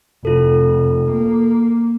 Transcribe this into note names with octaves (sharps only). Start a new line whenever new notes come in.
F1 F4 A4
A#3